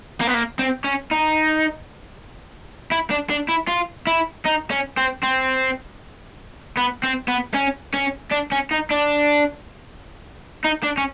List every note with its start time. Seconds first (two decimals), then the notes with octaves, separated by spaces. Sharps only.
0.21 A#3
0.28 B3
0.34 A#3
0.59 C4
0.84 C#4
1.11 D#4
2.91 E4
3.10 D4
3.30 D4
3.48 E4
3.68 F4
4.07 E4
4.46 D#4
4.71 C#4
4.97 C4
5.23 C4
6.77 B3
7.03 C4
7.28 B3
7.54 C#4
7.94 C#4
8.32 D4
8.52 C#4
8.71 D#4
8.90 D4
10.64 D#4
10.83 D4
10.98 C#4